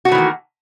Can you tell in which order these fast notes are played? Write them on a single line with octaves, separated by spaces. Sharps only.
F#4 A3 E3 D#3 A#3